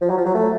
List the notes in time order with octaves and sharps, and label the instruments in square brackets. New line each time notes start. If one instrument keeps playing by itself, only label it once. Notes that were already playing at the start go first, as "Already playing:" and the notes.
[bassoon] F3
F#3
F3
F#3
A3